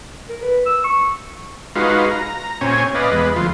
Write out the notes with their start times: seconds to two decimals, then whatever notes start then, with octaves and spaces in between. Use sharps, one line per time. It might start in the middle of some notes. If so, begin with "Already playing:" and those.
0.29 A#4
0.42 B4
0.66 E6
0.84 C#6
1.76 G#3 D#4 F4 F#4 B4 F5
2.11 A#5
2.61 A#2 C4 C#4 C#5 G#5
2.95 B4 D5 D#5 F5
3.12 E2 G#3 B4
3.36 D2 F3 F4